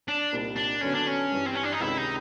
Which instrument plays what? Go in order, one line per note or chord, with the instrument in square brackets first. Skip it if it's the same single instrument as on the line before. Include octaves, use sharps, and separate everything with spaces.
[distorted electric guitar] D4
[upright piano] C2 A#2 G3 C4 D#4
[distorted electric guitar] D4
[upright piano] D3 F#3 B3 [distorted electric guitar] C#4
[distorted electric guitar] D4
C#4
[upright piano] G2 E3 G3
[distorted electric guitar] C4
C#4
D4
D#4
[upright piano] C#2 C3 D#3 G#3 C#4 [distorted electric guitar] E4
[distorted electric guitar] D#4